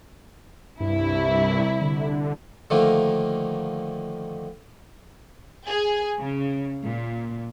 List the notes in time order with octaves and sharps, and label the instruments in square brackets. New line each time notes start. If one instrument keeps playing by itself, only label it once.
[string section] C2 E4 [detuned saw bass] G2
[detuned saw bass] D3
[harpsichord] D3 D#3 F3 A3 A#3
[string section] G#4
C#3
A#2